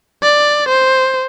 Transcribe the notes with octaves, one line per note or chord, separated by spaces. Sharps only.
D5
C5